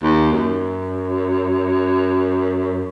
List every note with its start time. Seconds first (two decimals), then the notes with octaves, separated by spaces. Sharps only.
0.03 D#2
0.32 F#2